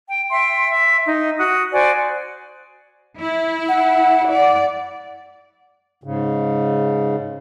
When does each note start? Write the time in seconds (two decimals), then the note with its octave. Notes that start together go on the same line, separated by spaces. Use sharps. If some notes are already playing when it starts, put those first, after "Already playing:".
0.08 G5
0.31 E5 G5 C6
0.69 E5
1.05 D#4
1.38 F#4 D#6
1.72 F#4 C5 D5 G#5
3.20 E4
3.69 F#5
4.28 D5
6.04 G#2 C#3